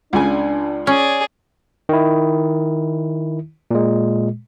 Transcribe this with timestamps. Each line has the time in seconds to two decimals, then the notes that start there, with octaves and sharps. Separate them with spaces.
0.13 C#2 C#3 D4 G#5
0.87 C#4 G#4 D5
1.89 D#3 E4
3.71 A#2 G#3